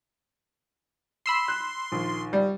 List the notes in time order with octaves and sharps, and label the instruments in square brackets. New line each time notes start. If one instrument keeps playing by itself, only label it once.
[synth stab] B5 E6 C7 [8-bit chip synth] C6
[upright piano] F#6
A#1 D#3
[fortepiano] G3